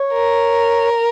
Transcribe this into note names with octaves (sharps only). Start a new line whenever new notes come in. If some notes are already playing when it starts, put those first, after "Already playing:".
Already playing: C#5
A#4